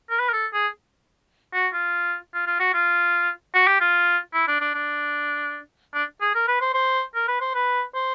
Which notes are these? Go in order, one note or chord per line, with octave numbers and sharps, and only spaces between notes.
A#4
B4
A#4
A4
G#4
F#4
F4
F4
F4
F#4
F4
F#4
G4
F4
E4
D4
D4
D4
D4
G#4
A#4
B4
C5
C5
A#4
B4
C5
B4
C5